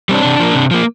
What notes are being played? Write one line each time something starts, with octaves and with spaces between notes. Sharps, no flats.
G3 C4 D4
C3
F3 A#3
C3
F3 A#3